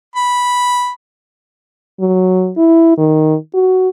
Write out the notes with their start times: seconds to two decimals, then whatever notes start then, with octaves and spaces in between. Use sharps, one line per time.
0.16 B5
2.00 F#3
2.57 E4
2.97 D#3
3.54 F#4